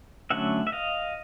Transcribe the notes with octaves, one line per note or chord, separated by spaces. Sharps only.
D3 F#3 A3 C#4 E5 F#5
E5
D#5 F5